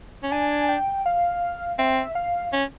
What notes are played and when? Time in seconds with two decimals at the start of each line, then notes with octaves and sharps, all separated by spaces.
0.23 C#4
0.32 D4 G#5
0.69 G5
1.06 F5
1.79 C4 E5
2.15 F5
2.53 C#4